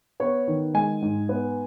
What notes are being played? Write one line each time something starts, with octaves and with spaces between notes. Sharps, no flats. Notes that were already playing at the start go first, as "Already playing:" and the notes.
B3 C#5
D#3
G#3 G#5
G#2
B3